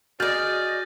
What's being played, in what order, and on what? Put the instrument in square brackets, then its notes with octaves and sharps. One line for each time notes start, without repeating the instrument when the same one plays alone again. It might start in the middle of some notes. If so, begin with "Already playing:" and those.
[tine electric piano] F#4 [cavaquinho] G#4 D5 [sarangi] D#5 [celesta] F6 G6 A6